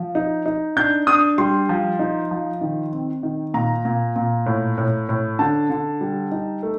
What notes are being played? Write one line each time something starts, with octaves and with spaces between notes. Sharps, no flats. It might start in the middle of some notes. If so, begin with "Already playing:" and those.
Already playing: F3
D#4
D#4
D4 G6
D4 D#6
G3 C6
F3
D#4
F3
D#3
C4
D#3
A#2 A#5
A#2
A#2
A2
A2
A2
D3 A5
D3
G3
D#4
A3